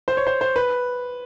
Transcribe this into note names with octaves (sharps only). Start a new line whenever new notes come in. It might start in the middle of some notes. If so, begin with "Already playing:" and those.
C5
C#5
C5
C5
B4